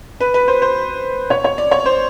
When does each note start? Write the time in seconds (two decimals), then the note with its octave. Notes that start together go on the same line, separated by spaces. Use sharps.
0.20 B4
0.34 B4
0.48 C5
0.62 C5
1.30 C#5
1.44 C#5
1.58 D5
1.71 C#5
1.86 C5